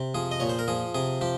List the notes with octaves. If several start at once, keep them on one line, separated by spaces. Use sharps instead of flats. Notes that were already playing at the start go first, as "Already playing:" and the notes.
Already playing: C3
F3 G#4
D#5
A#2 C#5
C5
A#4
F3 G#4
C3 G#4
F3 G4